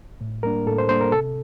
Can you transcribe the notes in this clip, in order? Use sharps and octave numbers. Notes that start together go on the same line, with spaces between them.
A2
G3 A#3 D4 A#4
A2 A4
C5
G3 A#3 D4 C5
A#4
C3 A4